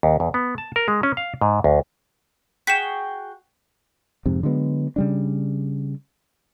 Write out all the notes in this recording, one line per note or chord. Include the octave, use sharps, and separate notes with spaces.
D#2
E2
B3
A5
A#4
G#3
C#4
F5
G#2
D2
F#4 G#4 G5 B6 E7
F2 G#2 C3
D3 F#3 G#3 B3
C#3 G3 D4